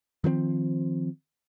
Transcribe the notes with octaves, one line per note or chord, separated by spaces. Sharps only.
D#3 F3 A#3 C4